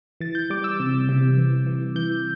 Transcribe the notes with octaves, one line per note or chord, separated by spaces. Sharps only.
E3 A6
G6
G3 D6
E6
C3
C3
E3
E3
E3 G6